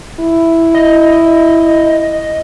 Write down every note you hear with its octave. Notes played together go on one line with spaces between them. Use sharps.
E4
D#5